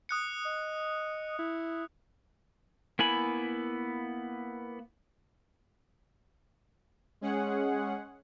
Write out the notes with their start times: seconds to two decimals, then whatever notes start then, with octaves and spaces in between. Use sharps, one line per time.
0.09 D#6 F#6 C#7
0.45 D#5
1.39 E4
2.99 A#3 B3 E4 G#5 B5
7.21 G#3 C#4 G#4 F#5